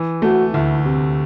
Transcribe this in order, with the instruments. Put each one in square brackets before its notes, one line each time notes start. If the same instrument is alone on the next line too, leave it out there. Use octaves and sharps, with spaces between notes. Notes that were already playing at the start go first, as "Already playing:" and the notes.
Already playing: [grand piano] E3
[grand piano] A3 [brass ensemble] F#4
[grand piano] D2 [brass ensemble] E4
[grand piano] C3